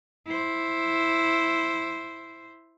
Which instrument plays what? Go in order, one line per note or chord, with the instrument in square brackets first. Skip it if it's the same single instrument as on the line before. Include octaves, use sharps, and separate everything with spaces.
[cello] E4 C5